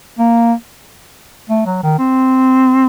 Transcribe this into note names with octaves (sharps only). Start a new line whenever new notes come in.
A#3
A3
F#3
D#3
C4